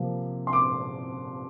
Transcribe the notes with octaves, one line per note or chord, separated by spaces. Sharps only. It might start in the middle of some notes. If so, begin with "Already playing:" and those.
Already playing: C3 F3 A#3
C6
D6